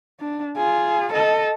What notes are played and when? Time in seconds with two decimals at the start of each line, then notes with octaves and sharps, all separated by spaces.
0.20 D4
0.57 F4 G#4
1.13 A4 D#5